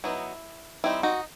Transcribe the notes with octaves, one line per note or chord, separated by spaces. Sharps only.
F#3 B3 D#4 E4
G3 C4 D#4 E4
D#4 F#4